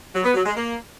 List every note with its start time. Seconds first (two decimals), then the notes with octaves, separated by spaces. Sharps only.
0.14 F#3
0.24 B3
0.35 F#3
0.45 G#3
0.56 A#3